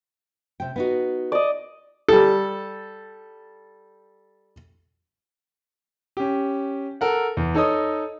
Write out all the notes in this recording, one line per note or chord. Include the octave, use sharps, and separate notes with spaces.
C3 G5
B3 D#4 F#4
D5 D#5
G3 A4
C#4 G4
A4 A#4 F#5
E2
D#4 A4 C#5 D#5 D#6